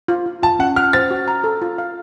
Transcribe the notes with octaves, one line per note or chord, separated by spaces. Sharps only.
F4
F4
F4 A5
C#4 F#5
F#5 F6
C5 A6
F#4
A#5
A4
F4
F5